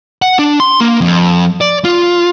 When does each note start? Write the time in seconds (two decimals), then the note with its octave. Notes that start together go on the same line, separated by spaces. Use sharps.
0.22 F#5
0.39 D4
0.60 C6
0.81 A#3
1.01 F2
1.61 D5
1.84 F4